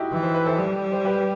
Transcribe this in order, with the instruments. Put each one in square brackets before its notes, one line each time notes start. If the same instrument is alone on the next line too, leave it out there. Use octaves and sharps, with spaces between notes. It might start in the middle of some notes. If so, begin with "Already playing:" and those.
Already playing: [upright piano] D#4 E4 F#4 G4
[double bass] E3
[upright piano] C5
B4
A4 C5
[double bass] G3
[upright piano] C5
G4 B4